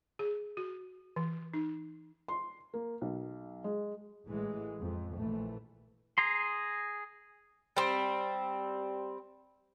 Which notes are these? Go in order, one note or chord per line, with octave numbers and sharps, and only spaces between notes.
G#4
F#4
E3
D#4
C6
A#3
B1
G#3
A1 E3 G#3
F2
A#1 E3 A3
G#4 A#5 C6
G3 C4